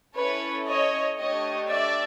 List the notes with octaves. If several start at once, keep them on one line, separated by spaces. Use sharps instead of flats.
C#4 E4 A4 B4 C#5
C#5 D#5
A3 D4 G4 C#5 D#5
D5 E5